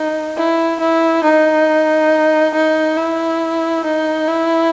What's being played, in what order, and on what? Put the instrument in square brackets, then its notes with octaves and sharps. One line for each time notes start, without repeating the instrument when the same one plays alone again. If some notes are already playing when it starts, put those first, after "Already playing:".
Already playing: [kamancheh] D#4
E4
E4
D#4
D#4
E4
D#4
E4